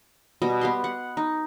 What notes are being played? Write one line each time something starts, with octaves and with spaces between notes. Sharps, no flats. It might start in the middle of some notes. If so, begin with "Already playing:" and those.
B2 G3 D#5
B3 G4 C6
F#5
D#4